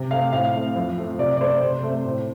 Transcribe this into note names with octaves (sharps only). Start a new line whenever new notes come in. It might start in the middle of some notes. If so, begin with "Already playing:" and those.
Already playing: C3
A3 C4 F5
A2 F5
A3 C4
F2
F3 A3 C4
C3 D5
D5
A3 C4 C5
C3
A3 C4
A2